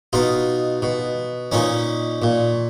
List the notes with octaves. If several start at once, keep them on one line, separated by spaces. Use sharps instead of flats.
B2 D#4 F4
B2
A#2 C#4 D#4
A#2